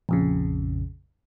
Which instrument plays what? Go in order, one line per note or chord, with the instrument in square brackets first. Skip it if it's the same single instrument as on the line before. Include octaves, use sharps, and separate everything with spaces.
[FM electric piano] A#1 F2 C#3